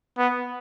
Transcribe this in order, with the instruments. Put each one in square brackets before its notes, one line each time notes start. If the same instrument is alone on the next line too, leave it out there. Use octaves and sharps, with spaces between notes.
[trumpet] B3